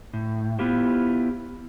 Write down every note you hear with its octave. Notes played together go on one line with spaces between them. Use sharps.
A2
B3 E4 F4 G4 C5